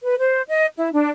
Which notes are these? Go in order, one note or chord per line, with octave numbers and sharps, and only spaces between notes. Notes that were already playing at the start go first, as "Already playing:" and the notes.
B4
C5
D#5
E4
D4